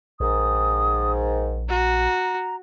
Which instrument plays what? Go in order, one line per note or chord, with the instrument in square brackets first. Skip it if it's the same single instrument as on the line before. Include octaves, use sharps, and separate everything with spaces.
[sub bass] A#1 [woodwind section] G#2 D#3 [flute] D#6
[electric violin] F#4 [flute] A#5